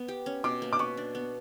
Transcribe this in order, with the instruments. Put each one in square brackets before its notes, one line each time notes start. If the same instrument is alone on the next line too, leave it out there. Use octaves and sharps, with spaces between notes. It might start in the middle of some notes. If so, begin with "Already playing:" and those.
Already playing: [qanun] B3
G4
C#4
[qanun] B2 [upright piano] D6
[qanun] A#3
[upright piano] D6
[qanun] B4 [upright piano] C#6
[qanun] D4
B3